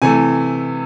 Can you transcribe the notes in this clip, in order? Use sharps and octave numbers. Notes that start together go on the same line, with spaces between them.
C3 E3 A3 G#5